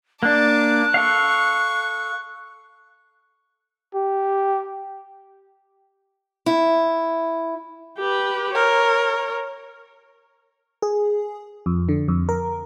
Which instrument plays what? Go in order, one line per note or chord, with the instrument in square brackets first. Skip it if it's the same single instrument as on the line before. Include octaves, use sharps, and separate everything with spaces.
[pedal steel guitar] A#3 D4 [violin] A5 D6 [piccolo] F#6
[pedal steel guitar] A4 F5 [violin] C#6
[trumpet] G4
[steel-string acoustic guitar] E4
[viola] G4 B4
[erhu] A#4 [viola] C#5
[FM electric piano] G#4
F2
D3
F2
A#4